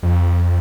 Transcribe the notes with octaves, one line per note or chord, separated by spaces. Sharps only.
F2